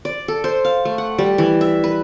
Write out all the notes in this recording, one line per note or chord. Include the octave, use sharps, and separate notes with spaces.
D5
A4
C5
F5
A3
F#5
G3
E3
E5
B4